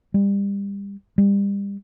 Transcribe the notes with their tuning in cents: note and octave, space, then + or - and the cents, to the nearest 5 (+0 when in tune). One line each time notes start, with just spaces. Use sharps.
G3 +30
G3 +30